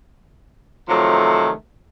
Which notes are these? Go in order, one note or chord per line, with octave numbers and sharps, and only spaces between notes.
C3 D#3 F3 F#3 A3